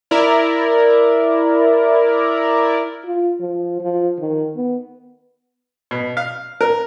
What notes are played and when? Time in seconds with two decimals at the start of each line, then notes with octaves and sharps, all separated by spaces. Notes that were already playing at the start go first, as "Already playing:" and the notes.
0.11 E4 A#4 D5
3.05 F4
3.40 F3
3.80 F3
4.19 D#3
4.56 B3
5.91 B2
6.17 F5
6.61 A#4